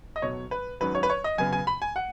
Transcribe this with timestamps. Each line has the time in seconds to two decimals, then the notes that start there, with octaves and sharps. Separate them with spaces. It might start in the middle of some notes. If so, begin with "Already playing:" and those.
0.16 D#5
0.22 B1 B2 F#3 C#5
0.51 B4
0.80 G#1 G#2 F#3 C#4 B4
0.95 C#5
1.03 B4
1.10 C#5
1.24 D#5
1.38 F#2 C#3 B3 G#5
1.53 G#5
1.67 B5
1.82 G#5
1.96 F#5